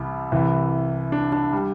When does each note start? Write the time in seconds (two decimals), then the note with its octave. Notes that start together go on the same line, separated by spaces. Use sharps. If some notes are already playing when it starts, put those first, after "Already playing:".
Already playing: C2 C3 E3 G3
0.32 C2 C3 E3
1.12 D4
1.32 D4
1.53 G3